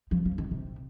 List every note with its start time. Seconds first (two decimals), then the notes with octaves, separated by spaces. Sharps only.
0.11 F3
0.25 F3
0.38 D#3
0.51 C3